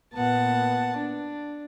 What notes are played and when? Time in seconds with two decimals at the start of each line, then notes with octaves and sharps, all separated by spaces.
0.14 A#2 B3 F#5 A5
0.97 D4